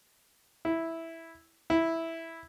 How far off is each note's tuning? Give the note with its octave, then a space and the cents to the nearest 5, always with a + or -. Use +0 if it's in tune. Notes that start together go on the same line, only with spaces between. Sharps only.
E4 -5
E4 -5